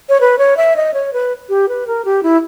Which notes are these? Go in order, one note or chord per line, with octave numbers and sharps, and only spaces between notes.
C#5
B4
C#5
E5
D#5
C#5
B4
G4
B4
A#4
G4
E4